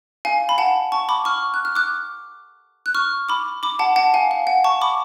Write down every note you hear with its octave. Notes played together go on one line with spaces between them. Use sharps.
F5 G#5
B5
F#5 A5
A5 C#6
B5 D6
C#6 F6
F#6
F6
D6 F#6
F#6
C#6 F6
B5 D6
B5 D6
F#5 A5
F#5 A5
F5 G#5
F5
F#5
A5 C#6
B5 D6